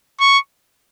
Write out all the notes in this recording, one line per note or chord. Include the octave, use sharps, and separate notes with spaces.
C#6